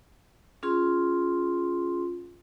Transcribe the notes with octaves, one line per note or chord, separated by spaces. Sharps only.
C#4 F4 G#4 C6